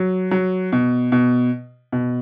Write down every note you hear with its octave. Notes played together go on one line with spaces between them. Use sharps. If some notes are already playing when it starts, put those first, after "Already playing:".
Already playing: F#3
F#3
B2
B2
B2